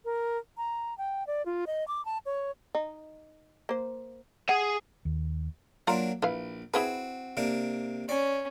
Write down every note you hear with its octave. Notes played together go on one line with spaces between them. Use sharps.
A#4
A#5
G5
D5
F4
D#5
D6
A5
C#5
D#4
A#3 C5
G#4 F#5 G#5
D#2
F#3 A#3 D4 F4 A#5
A#1 E4 B4 F5
C4 E4 F#4 G#4 B4
C3 A#3 D4
C#4 D5